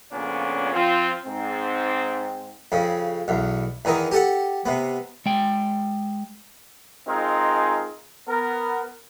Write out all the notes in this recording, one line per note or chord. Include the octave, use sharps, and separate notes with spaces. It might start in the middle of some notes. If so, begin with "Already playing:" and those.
F2 A#2 C#3 B3 C#4 D4
F3 C4 F4
G#2 C4
F2 C#3
B1 E2
E2 D#3 E3 D#4
G4 A4 F#5
C3 B3
G#3 G5
G#3 C4 D#4 F4 G#4 A#4
B3 A#4